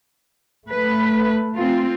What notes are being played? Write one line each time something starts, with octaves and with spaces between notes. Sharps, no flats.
A3 B4
C4 F4